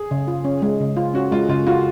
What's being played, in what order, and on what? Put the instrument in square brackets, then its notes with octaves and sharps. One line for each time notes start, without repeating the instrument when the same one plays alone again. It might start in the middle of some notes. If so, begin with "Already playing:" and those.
Already playing: [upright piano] G#4
[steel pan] C#3
F4
C#4
G#3
C#3
F4
[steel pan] C#4 [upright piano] F#4
[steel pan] G#3 [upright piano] F4
[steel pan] C#3 [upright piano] F4
[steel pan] F4 [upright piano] F#4